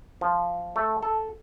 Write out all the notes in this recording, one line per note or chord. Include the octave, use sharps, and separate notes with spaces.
F3
A3
A4